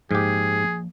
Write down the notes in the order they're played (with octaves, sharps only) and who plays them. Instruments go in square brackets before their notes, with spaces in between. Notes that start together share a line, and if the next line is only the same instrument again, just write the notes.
[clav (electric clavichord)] G#2 G4 [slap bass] F3 A#3 [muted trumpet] G#4